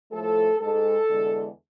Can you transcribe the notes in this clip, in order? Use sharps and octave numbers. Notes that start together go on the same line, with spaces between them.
A2 F3 A3 A4
G#2 G#3 A4
E2 D3 G#3